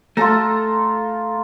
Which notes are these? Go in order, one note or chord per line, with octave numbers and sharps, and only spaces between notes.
A3 F4 A4 A#5